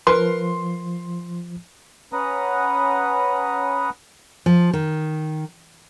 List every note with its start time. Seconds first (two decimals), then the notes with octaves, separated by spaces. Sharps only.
0.07 F3 A#4 B4 C6
2.13 C#4 B4 F#5 A#5 D#6
4.46 F3
4.73 D#3